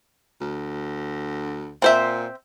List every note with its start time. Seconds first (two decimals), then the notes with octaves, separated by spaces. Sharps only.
0.41 D2
1.82 A#2 C4 C5 E5